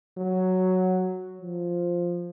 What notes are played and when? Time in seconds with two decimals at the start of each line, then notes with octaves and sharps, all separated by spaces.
0.18 F#3
1.41 F3